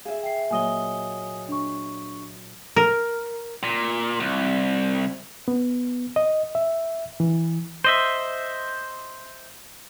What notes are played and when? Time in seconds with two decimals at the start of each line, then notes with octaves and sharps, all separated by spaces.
0.05 G#4 E5 F5
0.23 G5 C7
0.50 A#2 F#3 D#5 G#5 D#6 G7
1.48 D4 C#6
2.76 A#4
3.63 A#2
4.20 C2
5.48 B3
6.16 D#5
6.55 E5
7.20 E3
7.84 C5 D#5 E5